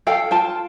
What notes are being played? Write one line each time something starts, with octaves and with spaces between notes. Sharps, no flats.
A4 F5 G5
F4 G5 A5